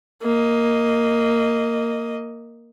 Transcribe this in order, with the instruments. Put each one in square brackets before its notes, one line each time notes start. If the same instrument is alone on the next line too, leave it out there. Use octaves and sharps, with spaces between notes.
[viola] A#3 D#5